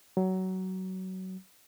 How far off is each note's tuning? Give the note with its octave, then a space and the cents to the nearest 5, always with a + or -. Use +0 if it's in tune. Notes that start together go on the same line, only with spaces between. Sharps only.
F#3 +20